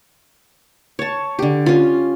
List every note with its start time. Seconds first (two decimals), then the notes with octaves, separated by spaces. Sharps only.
0.99 C#5 A5
1.39 D3 G4
1.66 C#4 F4